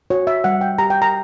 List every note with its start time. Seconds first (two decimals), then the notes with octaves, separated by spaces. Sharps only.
0.10 F#4 C#5
0.27 E5
0.44 G3 F#5
0.61 G5
0.78 G4 A#5
0.90 G5
1.02 A#5